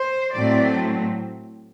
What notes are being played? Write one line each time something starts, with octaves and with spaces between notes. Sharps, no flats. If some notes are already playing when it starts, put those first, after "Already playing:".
Already playing: C5
A2 F#3 A3 C4 D5